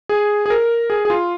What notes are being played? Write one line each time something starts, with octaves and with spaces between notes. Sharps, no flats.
G#4
G#4
A#4
G#4
G#4
F4